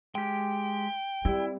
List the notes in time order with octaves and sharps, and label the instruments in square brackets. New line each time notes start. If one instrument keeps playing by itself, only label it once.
[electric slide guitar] G#3 G4 [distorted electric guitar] G5
[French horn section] G3 [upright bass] C4 [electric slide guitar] E4